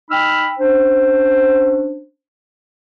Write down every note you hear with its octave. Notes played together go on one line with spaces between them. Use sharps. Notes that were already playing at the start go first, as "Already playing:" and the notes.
D#4 G5 B5 E6 F6
C#4 D4 C5